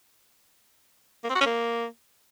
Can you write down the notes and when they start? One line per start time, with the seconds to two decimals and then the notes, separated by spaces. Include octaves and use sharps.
1.24 A#3
1.29 C4
1.35 F#4
1.41 C#4
1.46 A#3